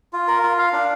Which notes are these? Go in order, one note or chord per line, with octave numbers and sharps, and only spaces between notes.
F4
A#4
F4
F5
D4